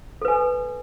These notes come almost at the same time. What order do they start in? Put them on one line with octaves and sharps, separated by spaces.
A4 B4 G#5